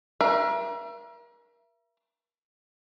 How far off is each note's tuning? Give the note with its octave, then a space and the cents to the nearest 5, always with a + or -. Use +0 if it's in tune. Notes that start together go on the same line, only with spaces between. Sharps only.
A#4 +35 E5 +35